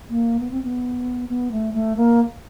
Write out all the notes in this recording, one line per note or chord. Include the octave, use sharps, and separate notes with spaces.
A#3
B3
C4
B3
B3
A3
A3
A#3